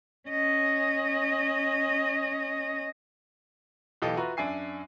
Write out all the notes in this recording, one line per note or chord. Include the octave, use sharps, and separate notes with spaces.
C#4 D#5
B1 E3 G4 A4 D#5 F5
F4 F#4 B4 E5 A#5 C#6
F#2 D4 E5 G#5 C7